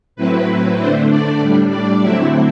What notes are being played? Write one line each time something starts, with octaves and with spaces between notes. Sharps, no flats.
A2 F#3 C4 E4 B4
D3 A3 D4 C5
D5
A2 G3 D4
D5
D3 F#3 A3 C4 E4 E5